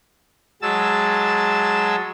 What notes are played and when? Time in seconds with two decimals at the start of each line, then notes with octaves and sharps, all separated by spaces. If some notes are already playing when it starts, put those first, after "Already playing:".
0.62 F#3 G#3 A5 E6